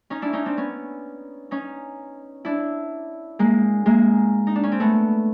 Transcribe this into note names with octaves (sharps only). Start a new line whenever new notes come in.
C#4 D#4
D4 E4
C#4 D#4
C4 D4
B3 C#4
C#4 D#4
D4 E4
G#3 A#3
G#3 A#3
D#4
D4
C#4
C4
A3 B3